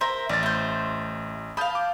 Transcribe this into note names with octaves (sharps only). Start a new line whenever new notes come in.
A#4 C5 E5
A1 D5 A6
A3 C5
F5 A5 B5 D#6 G6
D6